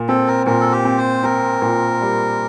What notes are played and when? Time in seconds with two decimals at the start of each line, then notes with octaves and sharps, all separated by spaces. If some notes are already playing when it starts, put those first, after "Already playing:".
Already playing: A#2
0.08 C4 A4
0.28 A#4
0.46 A#2 A#4
0.61 A4
0.72 G4
0.85 C4
0.98 C5
1.23 C4 A#4
1.62 A#2
2.01 G3